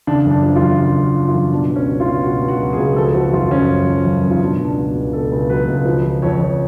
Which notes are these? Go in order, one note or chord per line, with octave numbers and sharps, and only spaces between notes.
C#3 D4
F#2
D4
F3
F4
F#2
C#3 F4
F#2
F#4
F3
F4
F#2
B2 D4
C#2
C#4
F#3
F4
C#2
B2 F#4
C#2
F#4
F#3
G#4
C#2
F3 A4
F3 F#4
F#2 F4
F#2 C#4
F3
F3
F#2
F#2
F4
B2 D4
C#2
D4
F#3
F#4
C#2
B2 A4
C#2
F#3 B4
C#2
F3
F3
F2 C#5
F2